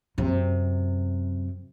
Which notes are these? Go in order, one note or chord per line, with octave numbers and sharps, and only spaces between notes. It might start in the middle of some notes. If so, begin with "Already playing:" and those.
F#2 C3